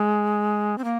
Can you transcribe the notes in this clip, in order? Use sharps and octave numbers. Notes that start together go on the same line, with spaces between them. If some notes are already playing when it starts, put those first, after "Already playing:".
Already playing: G#3
C4
A#3